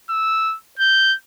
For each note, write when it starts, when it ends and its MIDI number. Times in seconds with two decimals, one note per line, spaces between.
0.10 0.56 88
0.79 1.15 91